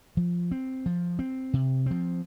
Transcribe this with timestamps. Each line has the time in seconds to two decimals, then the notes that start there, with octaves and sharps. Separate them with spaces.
0.17 F3
0.51 C4
0.86 F3
1.19 C4
1.53 C3
1.86 F3 C4